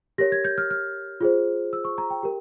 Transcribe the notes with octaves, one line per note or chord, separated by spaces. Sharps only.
G4 A#4 C#5 A#6
G#6
G6
F6
F6
F4 G#4 C5
E6
C#6
A#5
G5
G4 A#4